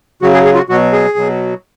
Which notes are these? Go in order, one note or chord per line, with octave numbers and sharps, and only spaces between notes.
C#3 F#3 F#4
G#4
G#4
F4
F#4
B2 F#3 F#4
G#4
B2 F#3